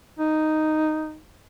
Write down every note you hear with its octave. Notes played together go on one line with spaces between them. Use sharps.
D#4